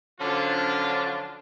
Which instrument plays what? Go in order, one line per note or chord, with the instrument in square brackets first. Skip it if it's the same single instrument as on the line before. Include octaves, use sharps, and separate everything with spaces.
[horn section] D3 F3 F#3 C#4 D4 F4